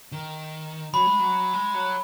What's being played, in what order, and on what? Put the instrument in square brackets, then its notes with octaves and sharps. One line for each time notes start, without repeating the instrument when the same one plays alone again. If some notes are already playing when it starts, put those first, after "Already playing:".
[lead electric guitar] D#3
[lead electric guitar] F#3 [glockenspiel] B5
[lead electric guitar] G#3
F#3
G#3
F#3